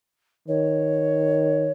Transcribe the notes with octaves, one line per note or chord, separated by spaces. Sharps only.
D#3 C#5